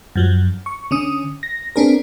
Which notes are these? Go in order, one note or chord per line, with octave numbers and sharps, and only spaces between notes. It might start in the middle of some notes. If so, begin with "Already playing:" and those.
F#2 F3 F#3
C#6
D3 C#4 D#6
A#6
B3 C4 D4 G#4 A#4